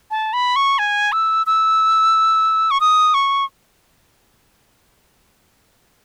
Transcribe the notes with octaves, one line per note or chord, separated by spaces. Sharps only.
A5
B5
C#6
G#5
E6
E6
C#6
D#6
C#6